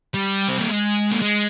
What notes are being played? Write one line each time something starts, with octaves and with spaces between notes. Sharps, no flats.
G3
C4
A#3
G#3
A#3
G#3